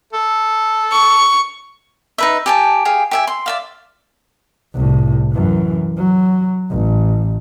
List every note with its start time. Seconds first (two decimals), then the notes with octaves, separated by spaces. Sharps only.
0.13 A4
0.92 C#6
2.18 D#4 B4 E5
2.46 G4 G#5 A5
2.85 G4 G#4 F5
3.11 G4 E5 G#5
3.27 C6
3.46 D5 E5 F5
4.74 C2 A2
5.32 F#2 E3
5.97 F#3
6.70 A1